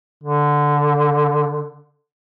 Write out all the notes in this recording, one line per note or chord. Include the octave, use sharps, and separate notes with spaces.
D3